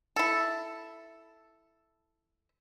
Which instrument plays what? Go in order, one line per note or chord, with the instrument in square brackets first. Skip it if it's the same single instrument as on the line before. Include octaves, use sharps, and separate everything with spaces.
[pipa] E4 A4